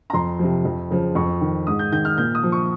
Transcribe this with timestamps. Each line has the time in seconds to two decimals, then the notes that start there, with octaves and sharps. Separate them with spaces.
0.10 A#5
0.13 F2 C6
0.39 C3 F3
0.65 F2
0.90 C#3 F3
1.15 F2 C#6
1.41 D#3
1.67 G#2 D#6
1.79 G6
1.92 D#3 G6
2.05 F6
2.18 A#2 G6
2.35 D#6
2.43 F3
2.52 C#6